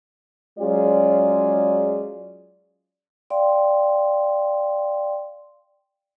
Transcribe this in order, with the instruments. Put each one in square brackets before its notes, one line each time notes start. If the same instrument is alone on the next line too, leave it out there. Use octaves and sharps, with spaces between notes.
[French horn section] F#3 G#3 C#4 F4 G#4 D5
[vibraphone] D5 F5 G5 C6